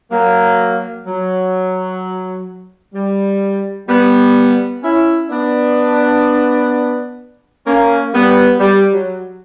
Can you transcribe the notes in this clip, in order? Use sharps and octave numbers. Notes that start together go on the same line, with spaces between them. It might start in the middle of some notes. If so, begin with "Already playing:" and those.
F#3 A#3
F#3
G3
G3 B3
C#4 E4
B3 D4
A#3 C#4
G3 B3
G3
F#3